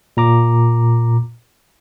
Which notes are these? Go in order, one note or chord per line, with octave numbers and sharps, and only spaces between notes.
A#2 A#5 D6